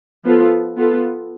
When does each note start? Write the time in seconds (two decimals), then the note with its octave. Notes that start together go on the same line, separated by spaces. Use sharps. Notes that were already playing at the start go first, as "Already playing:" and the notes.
0.24 F3 B3 F4 A4
0.77 B3 F4 A4